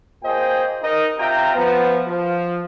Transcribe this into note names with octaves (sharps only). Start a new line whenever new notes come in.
A#2 G#4 C5 D#5 G5
D#4 A#4 D#5
C3 F4 E5 G5 A#5
F3 B3
F3